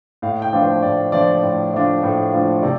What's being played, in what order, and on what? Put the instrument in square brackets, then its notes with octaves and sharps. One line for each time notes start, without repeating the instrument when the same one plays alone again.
[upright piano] A2 F5
G5
F3 A3 D4 F4
C5
A2 D5
F3 A3 D4 F4 D5
A2 D5
F3 A3 D4 F4
A2 C5
F3 A3 D4 F4
C3 D5